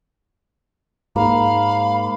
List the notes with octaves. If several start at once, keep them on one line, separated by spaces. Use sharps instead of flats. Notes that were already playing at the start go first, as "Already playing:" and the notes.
G#2 A#3 F5 B5